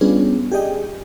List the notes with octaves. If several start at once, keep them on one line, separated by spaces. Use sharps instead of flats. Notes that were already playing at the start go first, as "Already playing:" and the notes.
G3 B3 C#4 D4 F4 G#4
G4 G#4 D5 D#5 G5